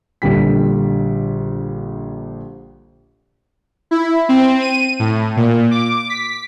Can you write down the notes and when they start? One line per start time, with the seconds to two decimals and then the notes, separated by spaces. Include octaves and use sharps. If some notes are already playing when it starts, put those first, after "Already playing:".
0.22 A#1 D3 G3 B6
3.91 E4
4.29 C4
4.61 D#7
4.99 A2
5.37 A#2
5.71 D6
6.10 B6